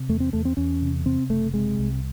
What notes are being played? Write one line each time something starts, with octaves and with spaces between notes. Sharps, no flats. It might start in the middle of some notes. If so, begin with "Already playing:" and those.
Already playing: C3
E2 A3
C4
E2 A3
C4
E2 C#4
C3
C3 C4
F#1 A3
C3 G#3
C2